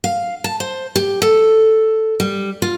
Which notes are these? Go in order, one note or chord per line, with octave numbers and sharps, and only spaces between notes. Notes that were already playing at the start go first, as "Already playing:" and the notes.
F5
A5
C5
G4
A4
G3
F4